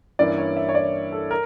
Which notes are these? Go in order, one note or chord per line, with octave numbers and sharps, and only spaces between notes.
G2 E3 A#3 C#4 E4 D5
C#5
E5
C#5
D5
A4
A#4